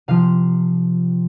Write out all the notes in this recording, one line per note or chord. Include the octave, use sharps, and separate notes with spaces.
C3 F3 F5